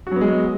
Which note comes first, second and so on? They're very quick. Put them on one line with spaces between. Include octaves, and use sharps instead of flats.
F#4 F#3 B3 G#3